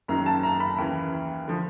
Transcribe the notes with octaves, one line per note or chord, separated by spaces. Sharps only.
F#1 F#2 D#3 F#3 A#5
A5
A#5
B5
D#2 C#3 E3
D3 F3